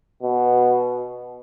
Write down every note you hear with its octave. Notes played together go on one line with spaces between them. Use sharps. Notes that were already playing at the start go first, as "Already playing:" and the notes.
B2